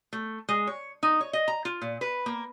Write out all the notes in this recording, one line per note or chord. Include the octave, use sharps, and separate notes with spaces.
A3
G#3
C#5
D#4
C#5
D#5
A#5
F4
A#2
B4
A#3